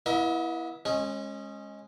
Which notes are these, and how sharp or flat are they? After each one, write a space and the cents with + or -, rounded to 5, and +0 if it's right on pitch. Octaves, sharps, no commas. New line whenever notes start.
B3 -40 E4 +0 D#5 +40
G#3 +0 C#4 -25